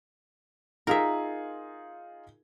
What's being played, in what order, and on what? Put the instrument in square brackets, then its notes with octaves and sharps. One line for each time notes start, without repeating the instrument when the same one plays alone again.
[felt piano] D#4 F4 G#4 [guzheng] A#4 E5